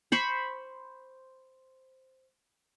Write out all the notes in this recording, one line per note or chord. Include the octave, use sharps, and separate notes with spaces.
C5 B5 C#6